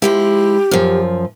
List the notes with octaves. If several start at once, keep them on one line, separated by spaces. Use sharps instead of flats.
F3 G#3 E4 G4
F#2 F3